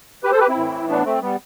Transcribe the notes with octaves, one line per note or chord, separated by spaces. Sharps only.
G4 B4
A4 C5
G4 B4
C4 E4
A2 E3
B3 D4
A3 C4
G3 B3